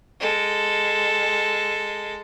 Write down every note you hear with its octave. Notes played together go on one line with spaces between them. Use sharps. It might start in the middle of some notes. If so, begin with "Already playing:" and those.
G#3 A4